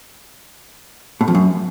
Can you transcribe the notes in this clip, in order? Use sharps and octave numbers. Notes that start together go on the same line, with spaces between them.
A2
F2
F#2